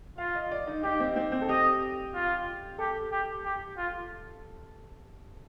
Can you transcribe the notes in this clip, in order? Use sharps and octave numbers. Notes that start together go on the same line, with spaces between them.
F4 F5
D#5
D5
D#4
D#4 G4
C4
C4
C4
A4
G4 D#5
F4
G4 A4
G4
G4
F4